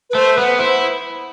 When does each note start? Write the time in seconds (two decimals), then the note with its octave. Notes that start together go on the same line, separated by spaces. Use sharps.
0.10 B4
0.15 A3 C5
0.36 B3 B4
0.59 E4 C5